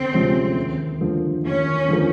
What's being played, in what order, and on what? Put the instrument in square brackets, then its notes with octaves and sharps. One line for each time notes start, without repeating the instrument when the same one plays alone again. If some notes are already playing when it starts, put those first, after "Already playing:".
Already playing: [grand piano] D2 [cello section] C4
[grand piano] C3 F3 G#3 C#4
D#2
D3 F3 A#3
[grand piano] D#2 [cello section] C#4
[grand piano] D3 F3 A#3